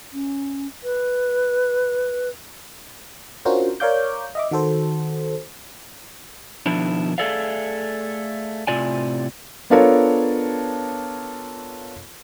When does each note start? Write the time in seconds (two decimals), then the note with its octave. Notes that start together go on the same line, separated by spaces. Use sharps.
0.13 C#4
0.84 B4
3.45 C#4 D4 F4 F#4 A#4 C5
3.80 A#4 C#5 D5 F5 D6 G6
4.35 D#5 E5 D6
4.51 D#3 F#4 A4 C5
6.66 B2 D#3 F3 D4 E4
7.18 A3 G#4 A4 D5 E5 F5
8.67 A2 C3 F4 D5 G#5
9.70 B3 D4 F4 A4 A#4 C#5